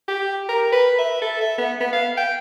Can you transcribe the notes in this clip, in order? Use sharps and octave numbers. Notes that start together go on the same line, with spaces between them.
G4
A#4
B4
E5
A4
E5
B3
B3
F5
G5